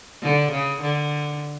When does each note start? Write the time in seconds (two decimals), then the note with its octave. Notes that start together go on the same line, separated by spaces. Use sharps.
0.22 D3
0.52 C#3
0.82 D3